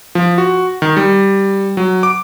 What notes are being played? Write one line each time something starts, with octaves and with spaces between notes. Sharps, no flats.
F3
F#4
D#3
G3
F#3
D6